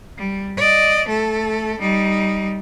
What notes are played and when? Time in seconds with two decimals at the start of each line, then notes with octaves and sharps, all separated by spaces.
0.18 G3
0.57 D5 D#5
1.09 A3 A4
1.79 G3 D#4